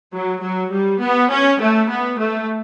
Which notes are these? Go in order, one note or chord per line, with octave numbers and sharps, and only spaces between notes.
F#3
F#3
G3
B3
C#4
A3
B3
A3